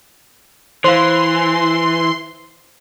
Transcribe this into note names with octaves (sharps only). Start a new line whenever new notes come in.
E3 C5 F5 C6